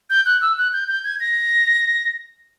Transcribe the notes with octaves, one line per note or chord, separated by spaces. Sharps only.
G6
F#6
E6
F#6
G6
G6
G#6
A#6